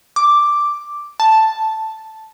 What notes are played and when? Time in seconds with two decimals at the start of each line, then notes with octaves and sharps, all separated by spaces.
0.16 D6
1.20 A5